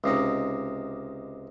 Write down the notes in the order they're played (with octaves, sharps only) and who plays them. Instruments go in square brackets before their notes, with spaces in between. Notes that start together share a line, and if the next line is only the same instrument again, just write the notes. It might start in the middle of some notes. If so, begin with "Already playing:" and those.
[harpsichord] C#2 C3 D#4